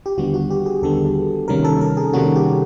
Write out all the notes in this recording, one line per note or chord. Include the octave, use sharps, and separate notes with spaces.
G4
D#2 D3 G3 B3 F#4
F#4
G4
G#4
D#2 D3 G3 B3 A4
C3 D#3 G3 A#3 C#4 A#4
A4
A#4
G#4
C3 D#3 G3 A#3 C#4 F#4
G4